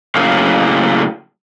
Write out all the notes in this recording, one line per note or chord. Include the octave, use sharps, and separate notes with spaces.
A2 C#3 F#3 A#3 F5